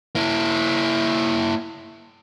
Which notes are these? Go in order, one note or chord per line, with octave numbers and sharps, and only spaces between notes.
A#3 E4